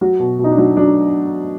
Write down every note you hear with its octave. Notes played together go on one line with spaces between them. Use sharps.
F#3 F#4
B2
B2 D#4
D4
F#3
F#3 D4